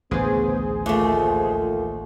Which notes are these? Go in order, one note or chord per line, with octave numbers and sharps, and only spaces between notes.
A1 D2 C#3 B3 G#4 C5
D#2 A3 F4